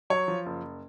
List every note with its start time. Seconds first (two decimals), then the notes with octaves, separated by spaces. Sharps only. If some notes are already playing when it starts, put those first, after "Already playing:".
0.10 F#3 C#5
0.28 F3
0.46 F#1